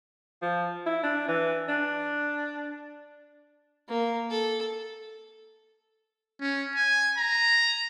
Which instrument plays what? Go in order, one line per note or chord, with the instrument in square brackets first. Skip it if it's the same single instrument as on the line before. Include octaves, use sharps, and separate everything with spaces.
[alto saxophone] F3
E4
D4
E3
D4
[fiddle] A#3
A4
[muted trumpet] C#4
G#5
A#5